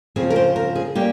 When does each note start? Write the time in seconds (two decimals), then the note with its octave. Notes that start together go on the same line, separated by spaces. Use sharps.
0.16 C#3 F3 C4 G#4
0.30 A#4
0.36 C5
0.56 A#4
0.75 G#4
0.95 G3 A#3 C#4 G4